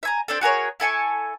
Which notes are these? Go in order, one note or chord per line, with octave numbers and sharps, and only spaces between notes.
E5 G#5 A#5
C4 D4 A4
F#4 G#4 A#4 C#5
E4 A4 G#5 C#6